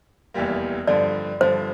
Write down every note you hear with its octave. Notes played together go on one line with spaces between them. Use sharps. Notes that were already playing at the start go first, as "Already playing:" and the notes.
F1 E2 E3 G3 A#3
G2 D3 F3 D5
G2 D3 F3 C5